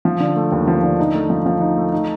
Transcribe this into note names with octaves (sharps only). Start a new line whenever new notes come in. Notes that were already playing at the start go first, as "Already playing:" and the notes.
F3
D3
A3
D#2
F3
D3
D#4
A3
F3
F3
D#4
A3
D#4